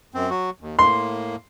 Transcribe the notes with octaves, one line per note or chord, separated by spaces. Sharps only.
F#2 C4
F#3 F#4
D#2
A2 A#3 C6